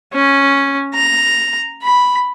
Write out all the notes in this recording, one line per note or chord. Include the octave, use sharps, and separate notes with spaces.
C#4
A#5
B5